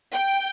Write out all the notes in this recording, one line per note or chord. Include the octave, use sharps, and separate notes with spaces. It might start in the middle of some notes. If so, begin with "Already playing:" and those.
G5